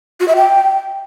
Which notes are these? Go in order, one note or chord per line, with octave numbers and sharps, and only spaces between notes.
F#4
E5
G5